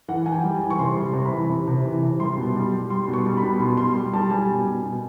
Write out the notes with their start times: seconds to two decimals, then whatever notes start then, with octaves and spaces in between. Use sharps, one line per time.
0.08 E3 F#5
0.26 E3 G#5
0.32 G5
0.44 G3
0.56 G#5
0.61 E3
0.70 C#6
0.79 C3 C6
0.96 G3
1.14 C3
1.26 B5
1.32 E3
1.50 C3
1.68 C3
1.84 E3
2.02 C3
2.20 G3 C6
2.37 B2
2.56 G3
2.73 G3
2.90 G3 C6
3.08 B2
3.13 C#6
3.26 G3
3.37 B5
3.43 B2
3.60 B2 C6
3.77 G3 C6
3.96 G3
4.13 G3 A5
4.31 G3 G#5
4.49 B2
4.65 B2
4.83 B2